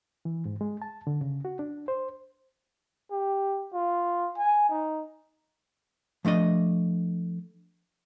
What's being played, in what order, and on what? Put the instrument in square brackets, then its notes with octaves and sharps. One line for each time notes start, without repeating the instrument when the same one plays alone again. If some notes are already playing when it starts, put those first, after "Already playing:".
[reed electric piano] E3
G#2
G#3
A5
D3
C#3
F#4
D4
C5
[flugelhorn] G4
F4
G#5
D#4
[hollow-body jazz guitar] F3 A3 D4 D#5